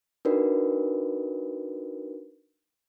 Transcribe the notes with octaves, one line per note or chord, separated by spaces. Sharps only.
D4 D#4 F#4 A#4 B4 D5